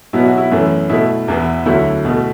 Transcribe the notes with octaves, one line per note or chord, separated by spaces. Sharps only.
B2 F#3 B3 E4
F#4
E4
F#2 E3 A3
B2 A3 E4
E2 E3 B3
D2 D3 F#3 E4
B2 A3